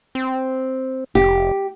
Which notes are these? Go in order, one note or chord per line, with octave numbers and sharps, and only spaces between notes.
C4
F1 G4